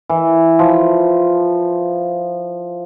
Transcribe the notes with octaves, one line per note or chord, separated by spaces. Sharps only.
E3
F3